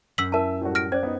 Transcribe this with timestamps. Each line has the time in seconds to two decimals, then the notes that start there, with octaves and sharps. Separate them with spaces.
0.18 F#2 E6 B6 F#7
0.32 E4 A#4 E5 A5
0.61 A2 G3 F#4
0.75 F6 A#6 D7
0.92 C#4 C5 D5 G#6
1.03 B3 D#4